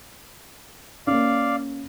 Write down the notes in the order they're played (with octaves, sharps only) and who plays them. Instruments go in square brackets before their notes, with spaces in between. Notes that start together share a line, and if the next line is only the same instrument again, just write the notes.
[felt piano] A#3 C#4 [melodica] D5 F5